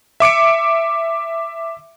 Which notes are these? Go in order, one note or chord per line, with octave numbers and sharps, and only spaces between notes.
E5 D6 C#7 D7